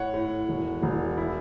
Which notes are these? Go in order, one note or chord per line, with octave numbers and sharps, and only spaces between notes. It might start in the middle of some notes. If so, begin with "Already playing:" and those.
Already playing: A2 C#5 F#5
A2
E1
E1
E4